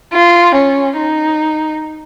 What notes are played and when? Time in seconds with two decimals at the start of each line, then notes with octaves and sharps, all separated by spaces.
0.13 F4
0.55 C#4
0.97 D#4